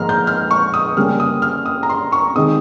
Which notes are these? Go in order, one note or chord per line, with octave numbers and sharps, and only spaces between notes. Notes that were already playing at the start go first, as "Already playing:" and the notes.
Already playing: G#2 F3 A#3 A#5 F6
G6
F6
C#6
D#6
C#3 G3 A#3 C#4 F6
D#6
F6
D#6
A#5
C6
C#6
C3 D#3 G#3 C4 D#6